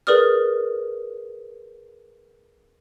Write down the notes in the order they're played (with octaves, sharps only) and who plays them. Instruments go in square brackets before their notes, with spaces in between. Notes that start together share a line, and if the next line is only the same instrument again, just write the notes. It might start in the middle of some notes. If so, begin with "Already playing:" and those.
[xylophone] G#4 A#4 B4 D5 D#6 F6